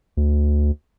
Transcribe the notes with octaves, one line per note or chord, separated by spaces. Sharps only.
D2